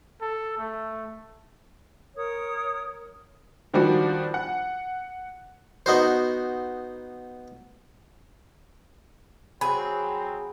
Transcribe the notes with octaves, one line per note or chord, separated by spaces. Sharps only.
A4
A3
A#4 C#5 D#6
D#3 F3 G3 D4 F#4
F#5
B3 D#4 F#4 C5
F#3 C4 G#4 B5